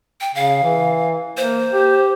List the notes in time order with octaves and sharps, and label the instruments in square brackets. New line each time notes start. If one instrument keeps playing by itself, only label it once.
[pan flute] G5
[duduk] C#3 [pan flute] F5
[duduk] E3
[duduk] A#3 [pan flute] C5
[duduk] G4